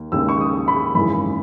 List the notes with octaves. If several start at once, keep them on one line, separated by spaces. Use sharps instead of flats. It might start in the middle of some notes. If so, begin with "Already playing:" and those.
Already playing: D#2
D#2 C#3 G#3 E6
C#6
D#6
B5
G#1 F#2 C#3 E3 B5